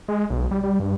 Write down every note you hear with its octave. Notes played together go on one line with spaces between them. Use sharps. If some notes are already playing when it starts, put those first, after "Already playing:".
G#3
B1
G3
G3
G2